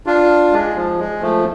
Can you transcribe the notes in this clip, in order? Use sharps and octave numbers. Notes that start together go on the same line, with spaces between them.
D4 F4
G#3
F3
G#3
F3 A3